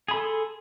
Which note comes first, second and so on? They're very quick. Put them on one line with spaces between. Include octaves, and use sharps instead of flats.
G#4 B5 A4 C6